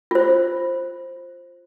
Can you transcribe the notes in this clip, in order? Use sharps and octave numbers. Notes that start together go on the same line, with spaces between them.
F4 C5